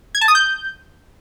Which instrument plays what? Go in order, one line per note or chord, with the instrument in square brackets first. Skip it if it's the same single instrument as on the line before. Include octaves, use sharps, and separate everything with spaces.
[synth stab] G#6
A5
D#6
G6